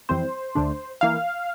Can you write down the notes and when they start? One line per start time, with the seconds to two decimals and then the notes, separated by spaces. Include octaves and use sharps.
0.09 F2 E3 G3 C4 C5
0.55 D2 D3 A3 D4
1.01 E3 A#3 F5